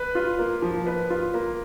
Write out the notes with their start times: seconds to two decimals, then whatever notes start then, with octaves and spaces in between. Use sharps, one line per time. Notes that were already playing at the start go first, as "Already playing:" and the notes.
Already playing: B4
0.15 F4
0.39 A#3
0.62 F3
0.86 B4
1.10 F4
1.34 A#3